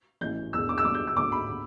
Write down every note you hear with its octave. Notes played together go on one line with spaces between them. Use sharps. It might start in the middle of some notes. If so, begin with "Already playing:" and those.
A1 A2 E3 G6
E1 E2 D3 E6
D6
E6
G1 G2 D3 D6
G6
E6
D2 D3 D6
B5
D3